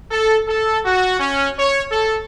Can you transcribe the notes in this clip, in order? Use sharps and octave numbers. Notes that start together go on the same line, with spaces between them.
A4
A4
F#4
C#4
C#5
A4